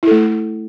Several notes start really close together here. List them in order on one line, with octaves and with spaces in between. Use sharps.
E4 A4 A3